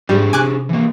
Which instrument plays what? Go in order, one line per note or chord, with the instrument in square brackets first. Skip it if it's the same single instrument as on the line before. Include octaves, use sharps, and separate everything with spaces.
[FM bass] G#2 [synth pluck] G3 [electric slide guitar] D4 G4 G#4
[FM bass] C3 [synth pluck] G#5 D6 F#6
[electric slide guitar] E3 A#3